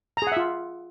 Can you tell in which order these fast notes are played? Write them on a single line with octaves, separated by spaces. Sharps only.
A#5 G#4 F#5 E5 F4